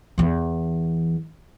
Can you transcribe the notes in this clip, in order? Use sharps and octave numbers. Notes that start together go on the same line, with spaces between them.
E2 E3